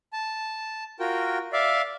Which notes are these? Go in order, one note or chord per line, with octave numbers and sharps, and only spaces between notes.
A5
F4 F#4 A#4 G5
D5 E5 F5